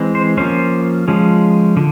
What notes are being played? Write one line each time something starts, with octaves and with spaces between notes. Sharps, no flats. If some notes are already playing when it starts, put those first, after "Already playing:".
Already playing: E3 G#3 C4
C5
F3 A#3 C#4 C5
F3 G#3 C#4
D3